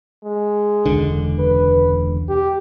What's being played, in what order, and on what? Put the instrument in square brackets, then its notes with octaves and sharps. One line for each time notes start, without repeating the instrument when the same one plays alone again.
[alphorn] G#3
[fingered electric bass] E1 C#2 D3
[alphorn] B4
G4